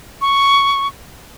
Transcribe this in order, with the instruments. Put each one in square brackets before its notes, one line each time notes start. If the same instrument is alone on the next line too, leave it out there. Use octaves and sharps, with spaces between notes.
[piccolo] C#6